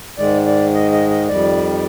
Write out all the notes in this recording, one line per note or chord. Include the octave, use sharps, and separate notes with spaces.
G#2 D#3 G#3 D5
D5
D#5
D#5
D#5
F2 D#3 G3 D5